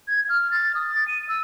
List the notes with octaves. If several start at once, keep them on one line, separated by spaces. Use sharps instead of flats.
G#6
F6
A6
D#6
A6
D#7
E6